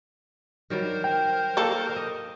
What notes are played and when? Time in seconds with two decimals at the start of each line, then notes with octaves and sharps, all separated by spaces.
0.70 D#3 F#3 G3 A#4 C5
1.04 G5
1.57 A#3 A4
1.96 D#5